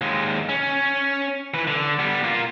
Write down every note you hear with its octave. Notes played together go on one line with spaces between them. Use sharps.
D#2 G#3
C#4
E3 B4
D3
G3 B3
A#3 F4